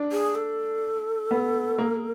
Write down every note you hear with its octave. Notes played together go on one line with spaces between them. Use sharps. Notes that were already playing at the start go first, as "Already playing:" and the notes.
Already playing: D4
G#4
A4
B3
A#3